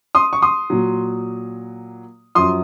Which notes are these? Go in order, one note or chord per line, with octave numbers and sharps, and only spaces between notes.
C6 D#6
C#6
C6 D#6
A#2 F#3
F#2 F3 C6 D#6